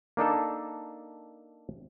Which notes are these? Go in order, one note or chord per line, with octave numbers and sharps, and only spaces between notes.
A#3 D4 D#4 A4